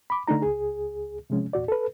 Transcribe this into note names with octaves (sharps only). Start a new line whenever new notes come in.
B5 D6
D3 A3 D4 D#4 A#5
C#2 G#4
C3 F3 G#3 C#4
E2 A#2 F#4 D5
A4 B4